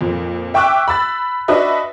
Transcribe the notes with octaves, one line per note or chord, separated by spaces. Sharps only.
F2 A#2
E5 G5 C#6 D6 E6 F#6
B5 E6 A6
D4 F#4 B4 D#5 E5